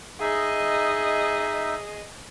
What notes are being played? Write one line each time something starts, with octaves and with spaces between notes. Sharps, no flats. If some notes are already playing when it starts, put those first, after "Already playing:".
D#4 G#4 D#5 E5